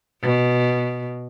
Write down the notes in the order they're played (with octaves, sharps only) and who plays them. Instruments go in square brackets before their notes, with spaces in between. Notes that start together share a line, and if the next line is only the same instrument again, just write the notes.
[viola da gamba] B2